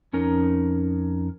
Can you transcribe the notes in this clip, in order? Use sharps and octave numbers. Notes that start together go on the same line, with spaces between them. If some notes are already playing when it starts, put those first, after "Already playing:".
F2 C#4 D#4 A#4